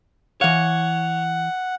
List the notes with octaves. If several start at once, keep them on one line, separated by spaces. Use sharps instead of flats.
E3 C#5 F5 F#5